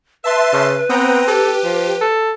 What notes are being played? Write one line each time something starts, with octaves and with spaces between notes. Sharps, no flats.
B4 E5 A5 C6
C#3
B3 C4 G5 A#5
G4 A4
F3
A4